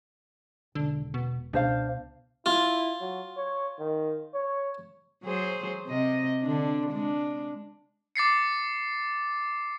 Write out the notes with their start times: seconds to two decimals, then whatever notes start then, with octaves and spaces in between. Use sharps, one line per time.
0.75 E1 D3
1.14 B2
1.53 C#2 B2 D4 C5 F5
2.46 E4 F4
3.01 F#3
3.37 C#5
3.79 D#3
4.34 C#5
5.24 F#3 G#4 C5
5.87 C3 D#5
6.42 D3 D4
6.90 G#3 D4
8.16 D6 A6 C7 C#7